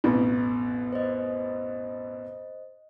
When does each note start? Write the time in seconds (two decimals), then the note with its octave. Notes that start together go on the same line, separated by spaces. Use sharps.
0.04 A1 F2 B2
0.93 C5 D#5